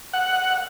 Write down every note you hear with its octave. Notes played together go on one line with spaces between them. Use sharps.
F#5